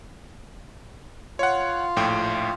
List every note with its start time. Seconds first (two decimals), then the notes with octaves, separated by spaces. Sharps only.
1.39 F4 C#5 F#5
1.96 A#1 A2 G5